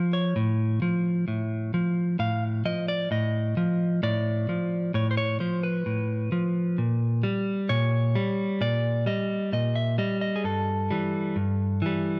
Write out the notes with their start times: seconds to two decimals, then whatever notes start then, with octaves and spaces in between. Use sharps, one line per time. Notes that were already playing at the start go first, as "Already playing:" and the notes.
Already playing: F3
0.13 C#5
0.36 A2
0.82 F3
1.28 A2
1.74 F3
2.19 A2 F5
2.65 F3 D#5
2.88 D5
3.11 A2 D#5
3.57 F3
4.03 A2 D5
4.49 F3
4.94 A2 C#5
5.11 C5
5.17 C#5
5.40 F3 C5
5.63 B4
5.86 A2
6.32 F3
6.78 A#2
7.23 G3
7.69 A#2 C#5
8.15 G3
8.61 A#2 D5
9.06 G3 D#5
9.53 A#2 D#5
9.76 E5
9.98 G3 D#5
10.21 D#5
10.36 G#4
10.44 G2 A4
10.91 E3 G3
11.36 G2
11.82 E3 G3